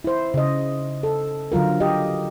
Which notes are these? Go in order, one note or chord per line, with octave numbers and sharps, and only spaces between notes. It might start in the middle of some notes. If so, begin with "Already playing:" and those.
E4 C5
C#3 D#5
A4
D3 F#3 F4 A#4
G4 D#5